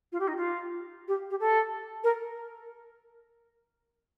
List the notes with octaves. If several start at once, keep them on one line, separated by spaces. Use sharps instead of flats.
F4
G4
D#4
F4
G4
G4
A4
A#4